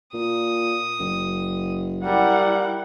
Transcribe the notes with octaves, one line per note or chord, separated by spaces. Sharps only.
A#2 D#6
F#1
G3 E4 A#4 F#5